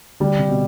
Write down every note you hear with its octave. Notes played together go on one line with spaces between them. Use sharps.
D3 G3
C3
B2